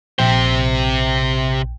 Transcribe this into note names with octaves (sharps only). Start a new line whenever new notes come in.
A#1 C3 C5 G5